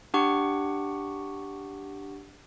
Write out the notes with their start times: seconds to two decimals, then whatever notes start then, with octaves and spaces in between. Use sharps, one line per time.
0.14 D4 G4 F#5 C#6